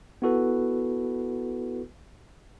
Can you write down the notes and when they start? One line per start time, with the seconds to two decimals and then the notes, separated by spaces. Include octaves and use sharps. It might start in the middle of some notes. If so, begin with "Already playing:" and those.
0.22 B3 E4 F#4 A4 B4